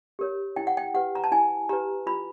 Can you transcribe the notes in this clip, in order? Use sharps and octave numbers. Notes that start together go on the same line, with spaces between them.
G4 A#4 C#5
E4 G5
F#5
G5
G4 B4 F#5
A#5
A5
E4 G#5
G4 B4 A#5
F4 B5